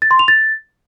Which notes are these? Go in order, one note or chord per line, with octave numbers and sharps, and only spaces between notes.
A6
C6
F7
A6